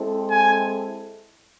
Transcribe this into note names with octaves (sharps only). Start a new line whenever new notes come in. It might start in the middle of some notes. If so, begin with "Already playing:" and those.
Already playing: G#3 C4 E4 A4
G#5